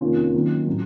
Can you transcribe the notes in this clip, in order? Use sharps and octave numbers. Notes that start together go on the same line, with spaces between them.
F1 D#2 C#3 C#4 F4
D#2 D#3 F#3
A2 F#3